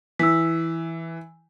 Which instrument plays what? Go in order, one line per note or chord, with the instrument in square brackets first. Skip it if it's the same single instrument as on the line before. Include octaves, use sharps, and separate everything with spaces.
[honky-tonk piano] E3 [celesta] E6 B6